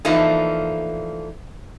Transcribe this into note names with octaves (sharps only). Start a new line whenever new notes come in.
E3 F3 A3 A#3 D4 D#4